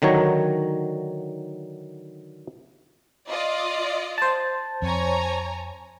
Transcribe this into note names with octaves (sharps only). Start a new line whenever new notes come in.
D3 D#3 F#3 C#5 A#5
F4 D5 D#5
C5 A5
F2 C#5 G#5 A#5